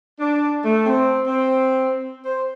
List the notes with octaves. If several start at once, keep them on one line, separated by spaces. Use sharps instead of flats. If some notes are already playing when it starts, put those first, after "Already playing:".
D4
A3
C4
C4
C5